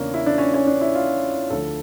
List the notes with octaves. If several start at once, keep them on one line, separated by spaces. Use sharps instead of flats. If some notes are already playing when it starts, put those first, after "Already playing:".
Already playing: E2 C#3 A#3 C#4 D4
E4
D4
C#4
C#4
D4
E4
F4
D2 D3 F3 A4